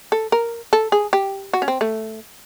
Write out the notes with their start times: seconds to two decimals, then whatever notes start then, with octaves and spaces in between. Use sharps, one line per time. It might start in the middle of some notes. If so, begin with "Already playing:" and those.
0.12 A4
0.32 A#4
0.73 A4
0.92 G#4
1.13 G4
1.53 F#4
1.62 C#4
1.68 C4
1.81 A3